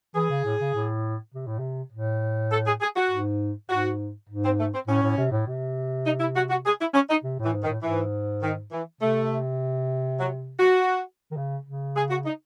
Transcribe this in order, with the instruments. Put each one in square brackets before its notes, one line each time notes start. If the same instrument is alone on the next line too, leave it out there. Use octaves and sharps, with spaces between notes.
[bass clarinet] E3 [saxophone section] G#4
[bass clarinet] C#3
A2
C#3
A2
C3
A2
C3
A2
[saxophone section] A4
G#4
G#4
F#4
[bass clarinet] G#2
[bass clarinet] G#2 [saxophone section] F#4
[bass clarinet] G#2
[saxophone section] C4
A3
C4
[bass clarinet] A2 [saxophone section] C#4
[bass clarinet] A2
C3
A2
C3
[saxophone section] D#4
E4
F#4
F#4
G#4
E4
C#4
D#4
[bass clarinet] C3
[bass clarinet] A2 [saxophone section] E3
[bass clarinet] G#2
[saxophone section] D#3
[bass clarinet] A2
[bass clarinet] G#2 [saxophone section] E3
[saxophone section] D#3
E3
[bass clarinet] C3 [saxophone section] A3
[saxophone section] F#3
F#4
[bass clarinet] D#3
C#3
C#3
[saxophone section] G#4
F#4
D#4